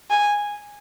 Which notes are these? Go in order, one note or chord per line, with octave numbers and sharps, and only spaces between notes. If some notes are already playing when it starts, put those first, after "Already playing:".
G#5